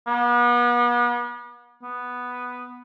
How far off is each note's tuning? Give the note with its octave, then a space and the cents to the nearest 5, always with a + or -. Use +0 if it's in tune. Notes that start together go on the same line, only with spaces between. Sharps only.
B3 -40
B3 +0